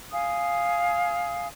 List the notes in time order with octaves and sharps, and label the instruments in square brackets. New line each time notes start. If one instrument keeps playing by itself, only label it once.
[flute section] F5 G#5 D#6